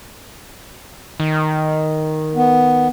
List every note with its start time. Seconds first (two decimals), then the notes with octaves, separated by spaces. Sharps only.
1.20 D#3
2.36 B3